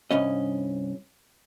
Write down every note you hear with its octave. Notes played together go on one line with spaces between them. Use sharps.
C2 G2 C#4 D#5